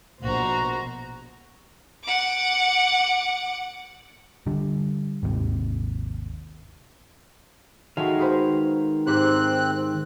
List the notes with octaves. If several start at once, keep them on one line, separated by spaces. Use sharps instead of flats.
A#1 B2 F#4 C5 A#5
F#5 D6
D3 G3
G#1 D#2 C3
D#3 G#3 A3 F#4 F5
G#4 B4 C5
G#2 C4 G4 C5 F#6